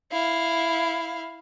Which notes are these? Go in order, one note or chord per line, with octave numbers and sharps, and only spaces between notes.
E4 F5